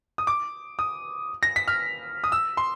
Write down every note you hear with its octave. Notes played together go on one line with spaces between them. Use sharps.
D#6
D6
D#6
A#6
B6
F6
D#6
E6
C6